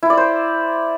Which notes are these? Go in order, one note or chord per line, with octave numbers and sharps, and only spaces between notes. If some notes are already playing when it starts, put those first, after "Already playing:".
E4
D5
C5